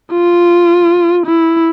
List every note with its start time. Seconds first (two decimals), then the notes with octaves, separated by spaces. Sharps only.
0.12 F4
1.26 E4